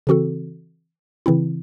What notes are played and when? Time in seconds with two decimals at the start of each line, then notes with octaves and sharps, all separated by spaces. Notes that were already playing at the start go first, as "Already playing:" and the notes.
0.07 C#3 E3 C4 F#4 A4
1.26 C#3 E3 C4 E4